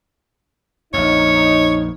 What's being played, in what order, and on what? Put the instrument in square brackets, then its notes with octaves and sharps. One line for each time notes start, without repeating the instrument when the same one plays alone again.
[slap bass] A#1 F2 [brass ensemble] D#4 [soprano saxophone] C#5